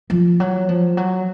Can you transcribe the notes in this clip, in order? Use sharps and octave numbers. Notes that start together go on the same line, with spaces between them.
F3
F#3
F3
F#3